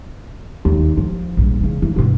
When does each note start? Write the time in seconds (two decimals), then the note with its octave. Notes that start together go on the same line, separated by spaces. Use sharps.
0.65 D#2
0.97 F3
1.37 A#1 G3
1.61 C#3 E3
1.82 E3
1.96 G2 B2